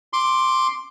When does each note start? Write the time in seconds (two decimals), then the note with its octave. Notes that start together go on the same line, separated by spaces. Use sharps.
0.13 C6 D6